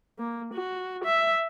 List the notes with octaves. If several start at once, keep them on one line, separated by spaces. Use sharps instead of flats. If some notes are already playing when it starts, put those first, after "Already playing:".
A#3
F#4
E5